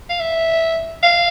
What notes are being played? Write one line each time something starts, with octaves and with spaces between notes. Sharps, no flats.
F5
E5
F5